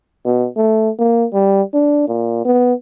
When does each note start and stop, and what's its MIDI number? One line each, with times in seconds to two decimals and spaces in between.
0.25 0.48 47
0.56 0.90 57
0.98 1.26 58
1.33 1.62 55
1.73 2.06 62
2.08 2.44 46
2.45 2.73 59